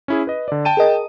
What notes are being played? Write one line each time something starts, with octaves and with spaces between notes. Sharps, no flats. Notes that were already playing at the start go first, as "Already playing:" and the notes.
C#4 E4 G#4
B4 D#5
D3 D5
G5 A5 D#7
G#4 A#4 D#5